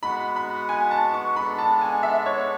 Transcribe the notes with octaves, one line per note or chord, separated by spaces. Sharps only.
G#3 B3 F#4 B4 F#5 B5
B5
G#5
A5
C#6
G#3 B3 D4 A4 B5
A5
G#5
E5
C#5